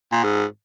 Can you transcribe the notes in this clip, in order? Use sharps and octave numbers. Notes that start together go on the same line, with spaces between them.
A#2
G#2